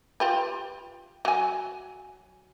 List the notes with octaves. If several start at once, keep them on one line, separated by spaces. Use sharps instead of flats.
F4 G4 B4
F#3 G#5